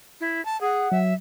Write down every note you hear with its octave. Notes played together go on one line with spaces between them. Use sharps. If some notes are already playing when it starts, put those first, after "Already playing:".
E4
A5
G#4 F#5
F#3 E5